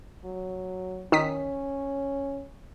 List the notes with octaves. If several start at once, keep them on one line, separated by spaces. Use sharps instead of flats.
F#3
D#3 C#4 D#6 B6